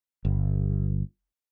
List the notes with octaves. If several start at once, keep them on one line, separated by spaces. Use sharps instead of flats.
G1